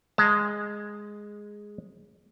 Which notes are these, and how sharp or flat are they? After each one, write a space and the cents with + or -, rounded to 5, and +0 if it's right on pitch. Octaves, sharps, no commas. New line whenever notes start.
G#3 +0 A5 +35